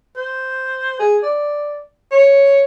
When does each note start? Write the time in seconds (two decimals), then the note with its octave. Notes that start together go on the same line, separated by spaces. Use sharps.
0.17 C5
1.00 G#4
1.23 D5
2.12 C#5